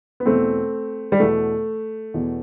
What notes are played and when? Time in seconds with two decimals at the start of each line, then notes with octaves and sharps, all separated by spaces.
0.20 B3
0.26 E2 B2 A3 C4
1.12 G3
1.20 E2 B2 A3
2.14 E2 B2